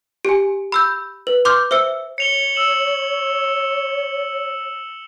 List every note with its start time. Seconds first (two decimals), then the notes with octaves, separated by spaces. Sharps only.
0.25 G4 G#5
0.72 B5 E6 G6
1.27 B4
1.45 C6 D6 F6 G6
1.71 C5 E5 E6 C#7
2.18 C#5 C#7 F7 G7
2.55 E6 E7 F#7